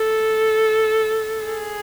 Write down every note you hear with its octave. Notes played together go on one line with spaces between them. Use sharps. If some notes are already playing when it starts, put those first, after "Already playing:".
Already playing: A4
G#4